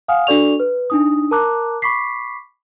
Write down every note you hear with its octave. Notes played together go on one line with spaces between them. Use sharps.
F5 F#5 G#5 D#6 F6
D4 F#4 A4 D5 C#6 F7
B4
D4 D#4 D#6
A#4 A5 A#5 D6 F#6
B5 C#6 D6 B6 C7